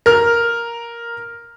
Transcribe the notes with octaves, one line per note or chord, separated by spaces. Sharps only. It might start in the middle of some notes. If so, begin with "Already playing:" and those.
A#4 F6